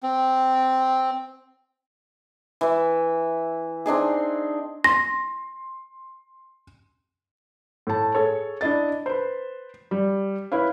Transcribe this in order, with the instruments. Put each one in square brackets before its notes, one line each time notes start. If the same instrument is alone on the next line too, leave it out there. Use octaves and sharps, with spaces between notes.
[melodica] C4
[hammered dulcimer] E3 E5
C4 D4 D#4 G#4
[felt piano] C6 [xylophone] A#6
[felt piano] A2 A5
G#4 A4 C#5
D4 E4 D#5 A6
B4 C5
G3
E4 B4 C#5 F5